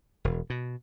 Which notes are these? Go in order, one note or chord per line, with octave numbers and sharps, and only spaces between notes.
E1
B2